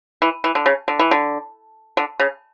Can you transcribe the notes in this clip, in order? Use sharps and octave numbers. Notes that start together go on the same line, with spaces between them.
E3
E3
D3
C#3
D3
E3
D3
D3
C#3